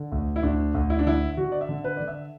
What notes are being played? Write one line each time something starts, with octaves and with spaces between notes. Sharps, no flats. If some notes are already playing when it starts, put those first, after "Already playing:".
Already playing: D3
D2
E4
D2 D4
D2
E4
D4
D3 E4
D3 F#4
D5
E5
D3
B4
D3 D5
E5